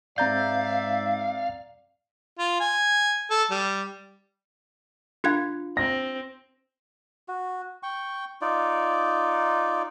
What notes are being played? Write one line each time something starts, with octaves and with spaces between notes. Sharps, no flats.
G#2 C4 D5 E5 F5 A#5 G6
F4
G#5
A4
G3
D4 F4 F5 F#6 G#6
C4 A#6
F#4
G5 C#6
D#4 F4 D5